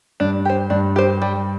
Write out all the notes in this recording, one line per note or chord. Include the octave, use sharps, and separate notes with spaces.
G2 D4
G4 C5
G2 D4
G4 C5
G3